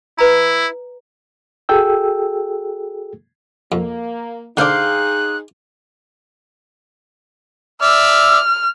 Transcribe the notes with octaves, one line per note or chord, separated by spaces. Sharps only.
E4 B4 A#5
F#4 G#4 A4 G5 E6
F2 A#3
D3 D4 D#4 G4 G#4 C5 F5 F#6
D5 E5 E6 F6